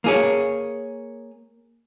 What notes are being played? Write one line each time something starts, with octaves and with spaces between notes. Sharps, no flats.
A#3 G#4 C#5